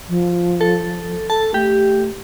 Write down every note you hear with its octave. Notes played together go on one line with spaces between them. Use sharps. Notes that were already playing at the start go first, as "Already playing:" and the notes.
F3
A4
A4 A5
A3 G4